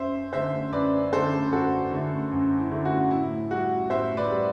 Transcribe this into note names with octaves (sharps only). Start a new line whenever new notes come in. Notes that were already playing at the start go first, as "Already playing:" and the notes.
Already playing: F#2 C5 E5
D3 A3 C5 E5
F#2 B4 D5
D3 A3 A4 C5
F#2 F#4 A4
D3 A3
F#2
E4
D3 A3
F#4
A2 E4
G3 F#4
A2 C5 E5
B4 D5
G3